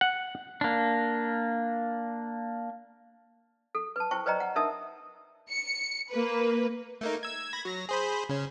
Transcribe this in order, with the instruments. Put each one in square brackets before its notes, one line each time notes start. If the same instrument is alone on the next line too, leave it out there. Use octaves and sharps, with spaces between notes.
[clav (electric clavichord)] F#5
[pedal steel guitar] A#3 D4
[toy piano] A4
B4 A5
E4 C5 G5 C#6
B4 C5 D5 D#5 G5 A#5
F#5
D4 D#4 A#4 E5 A5 D#6
[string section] C#7
A#3 B4
[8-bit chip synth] A3 A#3 D#4
E6 G#6
B5 G#6 A#6
F#3 A#6
G#4 C5 B5
C#3 C#4